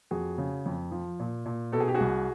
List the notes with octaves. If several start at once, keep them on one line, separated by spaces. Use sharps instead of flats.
F2 F#4 G#4
C#3
F2
F3
A#2
A#2
B2 A4
G#4
G4
F#4 G#4
C2